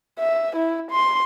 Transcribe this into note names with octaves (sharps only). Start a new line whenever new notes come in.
E5
E4
C6